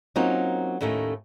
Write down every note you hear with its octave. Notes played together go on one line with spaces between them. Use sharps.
F#3 A#3 C4 C#4 D#4 F4
D#2 A2 A3 C#4 D#4